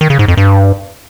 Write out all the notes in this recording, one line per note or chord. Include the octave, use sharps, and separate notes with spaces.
D#3
C#3
G#2
F2
G2